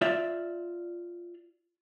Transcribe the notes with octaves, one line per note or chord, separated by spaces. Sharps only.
F4 D5 E5